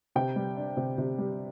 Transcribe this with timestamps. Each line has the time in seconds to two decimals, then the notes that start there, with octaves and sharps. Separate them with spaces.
0.16 C3 G5
0.36 G3
0.57 D4
0.77 C3
0.98 C3
1.18 G3